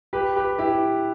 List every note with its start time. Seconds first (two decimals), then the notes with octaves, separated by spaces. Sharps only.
0.13 G4 B4
0.36 G4 B4
0.59 E4 G4